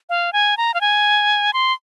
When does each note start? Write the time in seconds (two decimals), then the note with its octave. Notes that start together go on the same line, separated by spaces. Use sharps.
0.09 F5
0.33 G#5
0.57 A#5
0.74 F5
0.81 G#5
1.53 C6